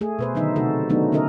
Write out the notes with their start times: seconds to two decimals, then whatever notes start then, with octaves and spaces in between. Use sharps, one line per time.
0.01 A3 G#4
0.19 B2 B4 C5
0.35 D3 D#3 F#3 D#4 E5
0.56 C3 A3 F#4 A4
0.89 D#3 F#3 A3 B3 D4 D#4
1.12 D3 C#4 D#4 A4 A#4 D#5